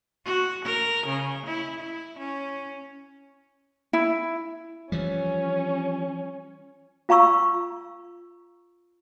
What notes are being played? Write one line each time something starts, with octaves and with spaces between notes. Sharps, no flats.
F#4
A#4
C#3
E4
E4
C#4
E4
E3 F3 G3 C#4
F4 F5 A#5 C#6 E6